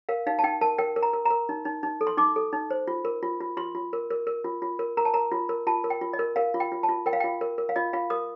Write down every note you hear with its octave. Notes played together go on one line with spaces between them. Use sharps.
A#4 F5
D#4 F5
A5
D#4 G5
A#4 A5
A#4 G5
A#4
A#5
A#4
A#4 A#5
D#4
D#4
D#4
A4
C6
D#4 D6
A4
D#4
C5
F4
A#4
F4
F4
F4 C6
F4
A#4
A#4
A#4
F4
F4
A#4
A#4 A#5
A5
A#4 A#5
F4
A#4
F4 A5
A#4
G5
F4
D#5
A#4
A#4 F5
F4
G5
F4
A5
F4
A#4 G5
F5
F4 G5
A#4
A#4
F5
F4 D#5
F4 F5
A#4 D#6